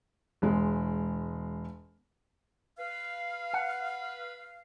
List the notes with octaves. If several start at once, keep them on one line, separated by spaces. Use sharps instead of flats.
E1 G#3
B4 F5
F#5